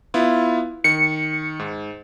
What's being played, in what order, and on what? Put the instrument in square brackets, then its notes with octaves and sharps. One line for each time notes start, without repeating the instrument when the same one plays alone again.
[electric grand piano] B3 E4 F4
[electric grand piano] D#3 [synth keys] C#7
[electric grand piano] G#2